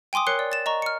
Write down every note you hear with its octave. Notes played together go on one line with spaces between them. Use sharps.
G5 G#5 C6 D6 D#6
A#4 C#5 F#6 C7 C#7 G7
D5
A6 E7
D#5 A#5 C#6
F6 C#7